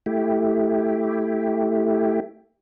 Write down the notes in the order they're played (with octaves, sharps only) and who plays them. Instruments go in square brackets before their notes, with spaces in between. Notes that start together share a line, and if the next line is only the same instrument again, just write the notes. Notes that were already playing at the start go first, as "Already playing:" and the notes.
[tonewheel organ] A3 E4 G4